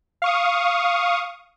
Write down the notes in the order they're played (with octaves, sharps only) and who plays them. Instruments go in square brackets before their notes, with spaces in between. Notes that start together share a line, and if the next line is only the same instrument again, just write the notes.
[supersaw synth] F5 C#6 D#6